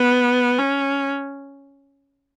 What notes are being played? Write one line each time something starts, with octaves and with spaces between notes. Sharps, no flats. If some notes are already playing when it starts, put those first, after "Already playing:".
Already playing: B3
C#4